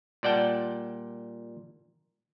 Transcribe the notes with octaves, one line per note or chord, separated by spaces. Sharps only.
A#2 G3 D5 F#5 G5 A5